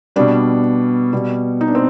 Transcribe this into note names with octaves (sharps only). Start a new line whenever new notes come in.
B2 G3 D4
B2 G3
D#4
D4
C4